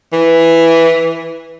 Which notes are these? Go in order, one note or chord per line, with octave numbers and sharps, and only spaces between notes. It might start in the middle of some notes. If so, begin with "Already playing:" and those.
E3